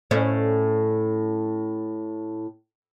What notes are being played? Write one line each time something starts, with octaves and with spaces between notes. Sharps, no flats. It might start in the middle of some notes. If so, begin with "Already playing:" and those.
A2 C#4